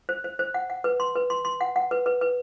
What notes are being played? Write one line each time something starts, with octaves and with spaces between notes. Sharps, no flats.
C5
C5
C5
F#5
F#5
B4
C6
B4
C6
C6
F#5
F#5
B4
B4
B4